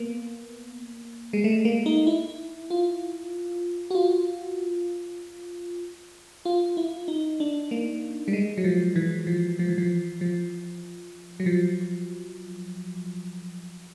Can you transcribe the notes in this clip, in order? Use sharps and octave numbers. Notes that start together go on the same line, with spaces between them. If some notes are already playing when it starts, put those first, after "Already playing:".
Already playing: A#3 B3
G#3
A3
A#3
D#4
E4
F4
F#4
F4
F4
E4
D#4
D4
A#3
G3
G#3
F#3
F3
E3
F3
F3
E3
F3
F3
F#3
F3